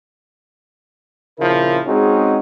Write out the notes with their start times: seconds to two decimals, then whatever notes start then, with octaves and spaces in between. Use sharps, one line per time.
1.39 A#1 C#3 F3 E4 A#4
1.87 G#3 C4 C#4 D#4 F#4 G#4